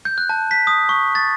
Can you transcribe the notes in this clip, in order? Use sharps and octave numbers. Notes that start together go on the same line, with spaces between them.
G6
F#6
A5
B6
D#6
C#6
A6